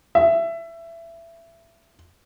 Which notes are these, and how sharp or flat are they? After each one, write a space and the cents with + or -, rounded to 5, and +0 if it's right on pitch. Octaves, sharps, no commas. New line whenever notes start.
E5 +20